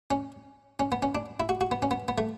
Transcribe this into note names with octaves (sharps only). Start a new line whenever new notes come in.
C#4
C#4
B3
C#4
D4
E4
F#4
F#4
B3
C#4
B3
B3
A3